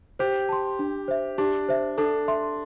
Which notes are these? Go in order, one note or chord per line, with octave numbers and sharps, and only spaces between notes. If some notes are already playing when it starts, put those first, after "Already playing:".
G4 C5
A5 C6
D4
C5 E5
D4 G4
C5 E5
D4 A4
E5 C6